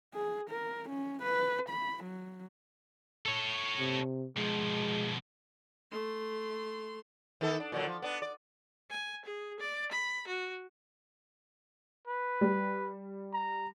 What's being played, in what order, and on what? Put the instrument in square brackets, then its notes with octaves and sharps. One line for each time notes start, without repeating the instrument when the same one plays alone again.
[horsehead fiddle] G#4
A#4
C#4
B4
B5
F#3
[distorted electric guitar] A4 C#5
[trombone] C3
[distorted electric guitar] B2 F3 [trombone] G#3
[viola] A3 C6
[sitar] D#3 B3 A4
D4
A#2 D3 F#3
F3
B3 D4
D5
[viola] G#5
G#4
D5
B5
F#4
[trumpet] B4
[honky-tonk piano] G3
[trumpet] A#5